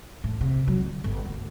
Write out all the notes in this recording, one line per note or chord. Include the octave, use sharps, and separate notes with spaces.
A2
C3
F#3
D3
G1
D2